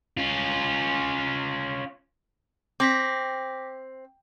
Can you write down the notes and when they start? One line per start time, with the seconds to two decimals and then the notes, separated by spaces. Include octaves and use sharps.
0.17 C#4 F4
2.80 C4 D6 A#6 B6